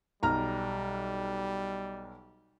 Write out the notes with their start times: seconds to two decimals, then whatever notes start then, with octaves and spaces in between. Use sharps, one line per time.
0.23 B1 G3 A#5 F6